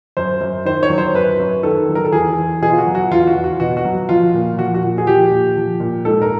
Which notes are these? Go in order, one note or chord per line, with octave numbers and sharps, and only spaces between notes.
F#2 C5
F#2
D#3 C5
C#5
F#3
C5
F#2 B4
F#2
D#3 A4
F#3
A#4
A4
E2 G#4
E2
B2 G#4
F4
F#4
F#3
F#4
E2 F4
F#4
E2
F#4
B2 F#4
F#4
F#3
F3 F4
A#2
F3 F#4
F#4
A#2
G#4
F3 G4
A#2
F3
A#2
G#2 A4
A#4